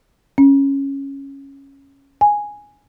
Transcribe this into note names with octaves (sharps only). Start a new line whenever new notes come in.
C#4
G#5